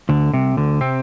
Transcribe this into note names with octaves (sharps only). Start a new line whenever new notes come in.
D2 D3
C2 C3
D2 D3
C3 C4